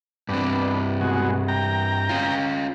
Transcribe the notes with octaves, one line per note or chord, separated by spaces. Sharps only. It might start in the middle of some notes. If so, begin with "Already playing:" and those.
G2 B3 C4 D4
B2 G#3 F#4
G5 A#5
C#4 F4